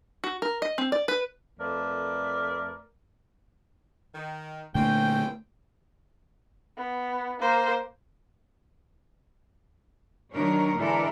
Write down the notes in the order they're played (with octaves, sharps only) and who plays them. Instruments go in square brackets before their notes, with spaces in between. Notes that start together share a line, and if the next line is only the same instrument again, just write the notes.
[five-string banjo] F#4
A#4
D#5
C4
D5
B4
[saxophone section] F2 A3 A#4 B4 D5
[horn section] D#3
[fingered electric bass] A#2 D3 A3 [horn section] C4 C#4 G5
[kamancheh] B3
A#3 C5
[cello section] D#3 F#3 D4 A#4 C#5
D3 E3 G#3 A4 A#4 D5